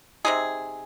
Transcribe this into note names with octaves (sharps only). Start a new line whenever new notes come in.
C3 F#3 C4 D#4 G#4